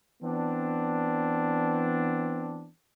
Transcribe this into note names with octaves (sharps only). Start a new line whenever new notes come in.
E3 B3 C4 D4